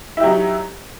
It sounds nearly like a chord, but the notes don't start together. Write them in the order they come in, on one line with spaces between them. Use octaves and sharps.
E4 G4 F#3 D#4